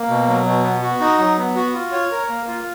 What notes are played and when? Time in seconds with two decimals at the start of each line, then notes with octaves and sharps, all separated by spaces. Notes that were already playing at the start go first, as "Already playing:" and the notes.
Already playing: A#3
0.09 B2
0.28 F#3
0.45 B2
0.64 B3
0.82 F#4
1.00 D#4
1.19 F#3
1.37 B3
1.56 F#4
1.74 F4
1.92 C#5
2.11 A#4
2.29 A#3
2.48 F4